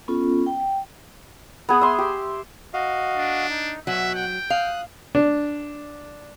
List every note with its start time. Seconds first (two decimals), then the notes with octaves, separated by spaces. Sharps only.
0.08 B3 C#4 F4 A4
0.46 G5
1.69 B3 G#4 B5
1.81 E5 C6
1.98 G4
2.74 F#4 D#5 F5
3.16 D4
3.50 D#4
3.87 B2 F#3 E5 F#5 F#6
4.15 G5
4.50 F5 D#6 F#6
5.15 D4